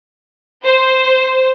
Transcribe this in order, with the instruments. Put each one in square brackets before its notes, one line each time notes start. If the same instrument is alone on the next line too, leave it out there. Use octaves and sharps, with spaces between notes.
[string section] C5